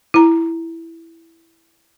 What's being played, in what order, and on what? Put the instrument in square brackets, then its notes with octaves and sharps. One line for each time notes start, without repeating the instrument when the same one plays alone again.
[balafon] E4 A#5